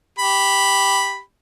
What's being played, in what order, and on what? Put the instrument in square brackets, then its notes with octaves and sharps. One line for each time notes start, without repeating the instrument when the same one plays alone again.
[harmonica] G4 B5